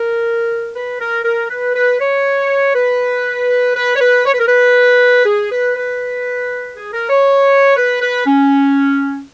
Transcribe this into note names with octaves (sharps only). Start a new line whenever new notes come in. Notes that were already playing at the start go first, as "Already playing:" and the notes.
Already playing: A#4
B4
A#4
A#4
B4
B4
C#5
B4
B4
C#5
B4
C#5
B4
A#4
B4
G#4
B4
B4
G#4
A#4
C#5
B4
B4
C#4